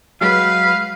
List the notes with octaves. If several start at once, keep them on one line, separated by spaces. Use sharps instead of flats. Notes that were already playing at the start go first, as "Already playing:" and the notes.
F#3 G#3 B4 F5